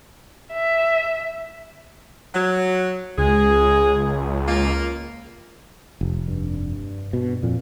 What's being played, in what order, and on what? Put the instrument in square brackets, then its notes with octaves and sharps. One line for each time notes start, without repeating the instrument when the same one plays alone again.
[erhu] E5
[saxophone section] F#3
[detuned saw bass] C#2 [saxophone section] G#3 G#4
[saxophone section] A#3 F4
[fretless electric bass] F1
[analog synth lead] G2
[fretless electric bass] B2
[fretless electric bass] F2 [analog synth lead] A#2